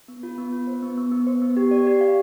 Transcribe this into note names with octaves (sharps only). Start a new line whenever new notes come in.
B3
F4
B3
F4
C5
B3
B3
B3
C5
B3
G4
D5
G4
F5